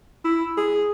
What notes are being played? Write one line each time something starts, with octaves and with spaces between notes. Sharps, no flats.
E4
G#4